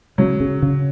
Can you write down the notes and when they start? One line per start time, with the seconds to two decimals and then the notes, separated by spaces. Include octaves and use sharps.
0.18 C#3 F#3
0.40 C#3
0.62 C#3